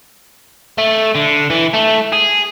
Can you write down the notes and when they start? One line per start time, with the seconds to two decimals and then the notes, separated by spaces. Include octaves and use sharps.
0.78 A3
1.15 D3
1.50 E3
1.73 A3
2.12 G#4